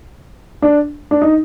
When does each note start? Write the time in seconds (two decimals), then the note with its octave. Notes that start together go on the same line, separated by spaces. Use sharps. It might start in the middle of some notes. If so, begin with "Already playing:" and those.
0.62 D4
1.11 D4
1.22 D#4